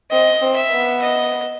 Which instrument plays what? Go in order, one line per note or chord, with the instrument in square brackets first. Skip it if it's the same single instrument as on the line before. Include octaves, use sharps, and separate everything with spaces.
[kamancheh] C4 [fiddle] D#5
[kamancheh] C4
[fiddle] E5
[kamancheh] B3
[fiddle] D#5